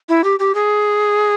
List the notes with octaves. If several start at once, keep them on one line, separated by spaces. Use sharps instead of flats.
E4
G4
G4
G#4